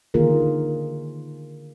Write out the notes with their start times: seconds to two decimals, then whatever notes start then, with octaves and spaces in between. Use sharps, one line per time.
0.14 D3 D#3 A#3 F4 G#4 A#4